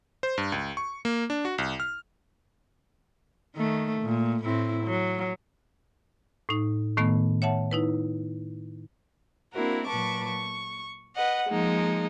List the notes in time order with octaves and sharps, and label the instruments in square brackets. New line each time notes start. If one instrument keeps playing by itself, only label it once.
[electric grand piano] C5
G2
C#2
C#6
A#3
D4
F#4
C2
F6
[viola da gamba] D#3 A3
A#2
A2 C4 E4
F#3
[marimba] A2 D#4
A2 D#3 A3 B3
C#5 E5 F#5 A5
D#4 E4 B4
[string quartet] A#3 C4 D4 E4 F#4 A#4
A#2 F#3 B4 A5 C#6 D6
C#6
B4 D#5 F#5
F3 G#3 A#3 D#4